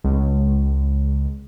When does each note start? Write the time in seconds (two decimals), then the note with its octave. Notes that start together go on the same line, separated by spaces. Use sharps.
0.04 C#2